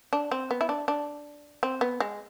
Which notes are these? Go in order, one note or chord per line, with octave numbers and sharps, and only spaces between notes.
D4
C4
B3
E4
D4
D4
C4
B3
G#3